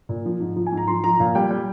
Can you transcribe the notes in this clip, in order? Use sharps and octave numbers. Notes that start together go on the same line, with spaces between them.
A#2
F3
G#2
F3
G#5
G#2
A#5
F3 C6
F3 A#5
A#2 F5
G3 G5
G3